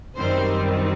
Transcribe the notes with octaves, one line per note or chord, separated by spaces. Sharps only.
F#2 D#3 G3 C4 C5